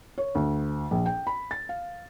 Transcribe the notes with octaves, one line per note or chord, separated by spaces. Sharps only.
C#5
D2
A#1
G5
B5
A6
F5